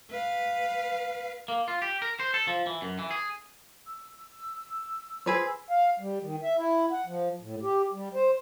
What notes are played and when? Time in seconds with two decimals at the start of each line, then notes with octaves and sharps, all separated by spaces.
0.11 B4 F5
1.48 A#3
1.68 F4
1.82 G4
2.02 A#4
2.20 C5
2.34 A4
2.48 F3
2.67 E3
2.82 F#2
2.99 E3
3.11 G#4
3.87 E6
5.26 G#4 B4 C5
5.70 F5
6.00 G3
6.21 D#3
6.43 E5
6.58 E4
6.92 F#5
7.07 F3
7.42 A2
7.62 G4
7.93 G3
8.14 C5